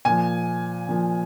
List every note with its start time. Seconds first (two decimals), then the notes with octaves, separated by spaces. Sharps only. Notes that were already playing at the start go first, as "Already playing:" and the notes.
0.05 A#2 F3 G#5
0.89 A#2 F3